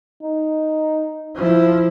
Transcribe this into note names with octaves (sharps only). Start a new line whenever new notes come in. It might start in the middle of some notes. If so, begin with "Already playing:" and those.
D#4
F3 E4